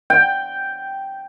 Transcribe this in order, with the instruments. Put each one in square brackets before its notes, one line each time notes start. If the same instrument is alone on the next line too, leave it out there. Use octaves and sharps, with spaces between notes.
[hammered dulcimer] G5